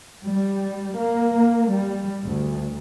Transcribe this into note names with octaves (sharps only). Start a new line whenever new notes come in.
G3
A#3
G3
D2